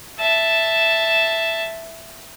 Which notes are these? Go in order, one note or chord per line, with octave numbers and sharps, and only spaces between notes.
E5 A5